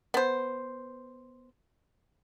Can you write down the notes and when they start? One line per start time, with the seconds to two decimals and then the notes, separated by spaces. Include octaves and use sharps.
0.14 B3 C5